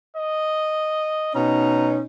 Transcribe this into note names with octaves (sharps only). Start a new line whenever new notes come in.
D#5
B2 C#4 D#4 A#5